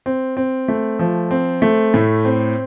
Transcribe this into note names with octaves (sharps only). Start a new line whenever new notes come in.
C4
C4
A3
F3
C4
A3
A2
C4